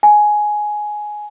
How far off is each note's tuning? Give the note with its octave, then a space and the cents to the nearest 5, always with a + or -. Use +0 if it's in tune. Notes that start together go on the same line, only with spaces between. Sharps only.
G#5 +10